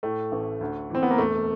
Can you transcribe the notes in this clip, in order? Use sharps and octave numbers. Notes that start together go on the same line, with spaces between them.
A2 A3
A1
D2
E3 C4
B3
A#3
E1 A3